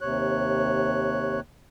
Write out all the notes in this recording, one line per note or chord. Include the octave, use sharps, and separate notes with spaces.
D#2 C3 C#5 F#6